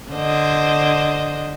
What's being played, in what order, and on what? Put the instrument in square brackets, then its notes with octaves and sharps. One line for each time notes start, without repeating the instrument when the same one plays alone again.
[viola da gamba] D3 C5 D#5